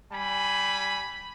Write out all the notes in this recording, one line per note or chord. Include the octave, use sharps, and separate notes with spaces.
G3 G#5 B5